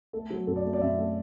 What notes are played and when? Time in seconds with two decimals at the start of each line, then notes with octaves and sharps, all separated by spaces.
0.13 A3 A4
0.30 F#3
0.47 F#2 A4
0.56 D5
0.65 A3
0.73 D5
0.81 F#2 E5
0.98 A3